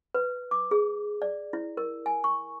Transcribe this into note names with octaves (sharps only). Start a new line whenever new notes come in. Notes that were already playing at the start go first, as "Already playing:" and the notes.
B4
D6
G#4
D5
E4
A#4
G#5
C#6